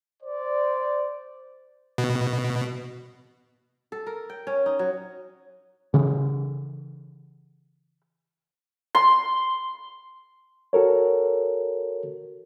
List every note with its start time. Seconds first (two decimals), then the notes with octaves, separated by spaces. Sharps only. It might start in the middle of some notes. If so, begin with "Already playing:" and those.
0.23 C5 D5
1.98 B2
3.92 A4
4.07 A#4
4.30 G5
4.47 C#4
4.66 D#4
4.79 F#3
5.94 C#3 E3
8.95 C6
10.73 F#4 A4 A#4 C#5